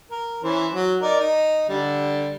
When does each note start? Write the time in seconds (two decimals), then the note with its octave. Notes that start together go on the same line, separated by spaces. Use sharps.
0.11 A#4
0.44 E3 C#4 C5
0.74 F#3
1.02 D#4 A#4 D5
1.20 D#4
1.69 D3 G3